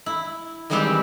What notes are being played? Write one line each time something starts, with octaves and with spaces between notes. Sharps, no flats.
E4
D#3 E3 G3 G#3 C4 G4